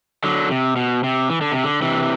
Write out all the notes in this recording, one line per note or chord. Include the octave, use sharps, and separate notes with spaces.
D3 F#3
C3
B2
C3
E3
D3
C3
D3
C3 E3